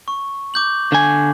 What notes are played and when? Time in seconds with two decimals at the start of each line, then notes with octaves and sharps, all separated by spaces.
0.08 C#6
0.54 D6 G6 F#7
0.92 D3 G#5